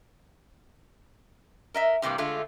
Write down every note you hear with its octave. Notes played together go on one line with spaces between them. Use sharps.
A#4 D#5 E5
G2 C3 E3 G3 A#3
D3 G#3 A3 F4